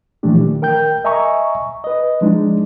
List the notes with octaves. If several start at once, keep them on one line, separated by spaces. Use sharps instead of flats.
A#2 E3 F3 A3 D4 G4
D#3
A#4 G5 G6
D#5 E5 G#5 A#5 C#6
B4 D#5
F3 G#3 D4 D#4